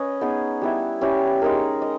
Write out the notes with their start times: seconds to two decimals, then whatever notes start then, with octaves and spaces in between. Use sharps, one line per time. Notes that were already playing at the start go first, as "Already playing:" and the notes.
Already playing: C#4 B4 D#5
0.21 B3 D#4 G#4
0.61 G3 B3 E4
1.01 G3 C#4 E4 G4
1.42 G#3 D#4 A#4
1.82 D#5